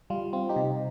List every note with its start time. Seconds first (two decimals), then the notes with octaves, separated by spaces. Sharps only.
0.10 G3 F4
0.33 C4 F4
0.49 D#4 G4
0.56 C3